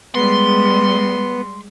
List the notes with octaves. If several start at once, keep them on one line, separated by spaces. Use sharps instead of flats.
G3 G#3 B3 C6